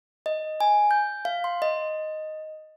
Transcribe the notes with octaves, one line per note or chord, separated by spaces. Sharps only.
D#5
G#5
G6
F5
C6
D#5